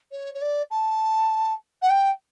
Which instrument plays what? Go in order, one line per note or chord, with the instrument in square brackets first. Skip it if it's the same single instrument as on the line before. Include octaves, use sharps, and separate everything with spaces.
[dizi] C#5
C#5
D5
A5
F#5
G5